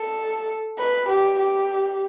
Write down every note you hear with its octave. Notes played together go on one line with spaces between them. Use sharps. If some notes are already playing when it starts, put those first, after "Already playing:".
Already playing: A4
B4
G4
G4